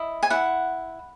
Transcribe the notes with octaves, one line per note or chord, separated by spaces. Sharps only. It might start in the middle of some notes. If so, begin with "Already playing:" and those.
Already playing: E4 D#5
G#5
E4 F#5